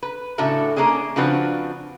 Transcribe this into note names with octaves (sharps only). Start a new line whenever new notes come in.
B4
A2 C#3 D4 F#4 A4 E5
A#3 C#4 D4 G#4 D#5
C#3 F3 C4 D4 F#4 B4